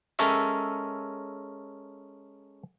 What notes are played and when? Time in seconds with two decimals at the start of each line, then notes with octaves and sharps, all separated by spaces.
0.19 G#3 C#4 A4 A#4 C#5 E5